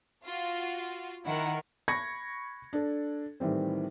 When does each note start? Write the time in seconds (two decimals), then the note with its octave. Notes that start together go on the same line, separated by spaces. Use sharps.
0.25 F4 F#4
1.26 D#3 E4 A#4 F#5
1.88 B5 C#6 G#6 A#6 C#7
2.73 D4 A4
3.40 A2 D#3 E3 G3 C4